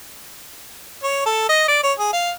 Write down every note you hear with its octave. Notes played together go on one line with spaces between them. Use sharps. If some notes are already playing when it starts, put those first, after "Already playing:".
C#5
A4
D#5
D5
C#5
G#4
F5